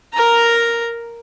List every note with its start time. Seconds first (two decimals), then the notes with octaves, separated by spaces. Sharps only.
0.13 A#4 A#5